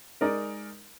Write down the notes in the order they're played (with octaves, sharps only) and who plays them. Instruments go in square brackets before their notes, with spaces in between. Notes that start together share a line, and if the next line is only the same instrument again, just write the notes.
[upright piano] G#3 D#4 A#4 D5